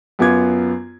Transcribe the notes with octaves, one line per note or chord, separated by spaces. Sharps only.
F#2 B3 F4 D6 G#6